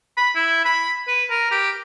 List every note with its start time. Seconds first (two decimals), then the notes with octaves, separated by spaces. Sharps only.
0.17 B5
0.36 E4
0.65 B5
1.08 B4
1.30 A#4
1.51 G4